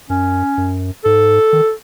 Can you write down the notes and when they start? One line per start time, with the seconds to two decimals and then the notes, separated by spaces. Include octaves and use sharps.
0.10 F#2 C#4
0.58 F#2
1.05 G#2 A4
1.53 D#3